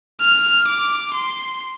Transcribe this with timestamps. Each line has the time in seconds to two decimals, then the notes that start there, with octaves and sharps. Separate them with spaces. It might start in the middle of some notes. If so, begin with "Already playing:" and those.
0.20 F6
0.67 D6
1.14 C6